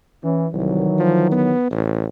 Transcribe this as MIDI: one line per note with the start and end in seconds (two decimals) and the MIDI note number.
0.23 0.46 52
0.23 0.46 61
0.54 0.87 36
0.54 1.53 51
0.54 1.53 52
0.54 1.53 54
0.99 1.30 53
1.32 1.69 59
1.71 2.06 33